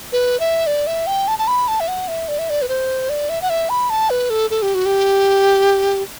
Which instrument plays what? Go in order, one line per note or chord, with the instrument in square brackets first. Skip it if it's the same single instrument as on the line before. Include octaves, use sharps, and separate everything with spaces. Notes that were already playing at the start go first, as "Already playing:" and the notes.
[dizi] B4
E5
D5
E5
G5
A5
A5
B5
A5
E5
F#5
E5
D5
E5
D5
B4
C5
D5
E5
F#5
E5
B5
A5
B4
A4
A4
G4
F#4
G4